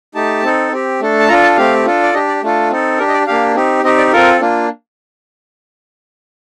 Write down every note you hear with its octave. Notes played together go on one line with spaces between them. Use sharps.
A3 D#4 G4 A5
C4 D#4 A4
C4 G4
A3 D4 A4
A5
D4 F4 A4 A#5
A5
A3 C4 G4 F5
D4 F4 A4
D5
D4 G4 D#5
D5
A3 D4 F4 A4
C4 D#4 A4
D4 G4 A#4
D#5
D5
A#3 D4 G4 F5
C4 D#4 G4
C4 D#4 G4 D#5
D5
C4 F4 A4 A#4
A#3 D4 F4